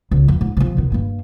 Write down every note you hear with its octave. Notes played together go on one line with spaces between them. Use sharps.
C#2
F2
G#2
C3 F3
B2 D#3
G2 A#3